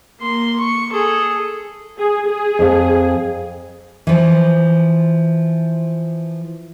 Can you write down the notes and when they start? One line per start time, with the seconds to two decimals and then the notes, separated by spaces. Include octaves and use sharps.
0.19 A#3 C6
0.60 C#6
0.92 G#4 A4
1.98 G#4
2.27 G#4
2.59 F2 F5
4.07 E3 F3